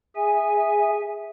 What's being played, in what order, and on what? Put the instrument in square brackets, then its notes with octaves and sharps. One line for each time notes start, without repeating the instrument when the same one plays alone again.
[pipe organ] G#4 E5 G#5